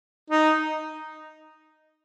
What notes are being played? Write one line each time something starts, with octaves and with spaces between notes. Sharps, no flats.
D#4